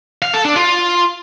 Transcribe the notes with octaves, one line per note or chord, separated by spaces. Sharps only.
F5
A4
D4
F4